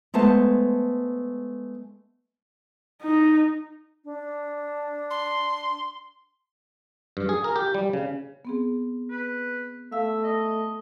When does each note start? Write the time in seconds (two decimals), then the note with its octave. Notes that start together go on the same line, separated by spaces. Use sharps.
0.14 G#3 A3 B3 C5 A5
3.02 D#4
4.04 D4
5.10 C6
7.17 G2
7.29 G#4
7.44 A#4
7.56 G4
7.74 G3
7.93 C#3
8.45 B3 C4 G#4
9.10 B4
9.92 A3 E5 F5
10.24 D#5